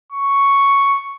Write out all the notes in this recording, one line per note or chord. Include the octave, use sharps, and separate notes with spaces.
C#6